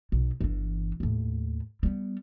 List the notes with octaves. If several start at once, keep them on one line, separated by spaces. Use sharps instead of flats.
B1
G1 E3
D#2 A2
G3 B3